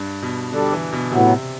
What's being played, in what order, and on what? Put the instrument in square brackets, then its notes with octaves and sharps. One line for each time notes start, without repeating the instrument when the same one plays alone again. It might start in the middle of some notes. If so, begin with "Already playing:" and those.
Already playing: [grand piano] G2
B2
[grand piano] D3 [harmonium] G3 D4 A4 D5
[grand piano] E3
B2
[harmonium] A2 F#3 B3 [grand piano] C3